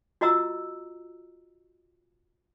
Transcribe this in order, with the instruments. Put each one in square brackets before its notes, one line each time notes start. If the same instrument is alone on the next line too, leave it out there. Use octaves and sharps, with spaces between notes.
[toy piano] F4 F#4 D#5 A#5 E6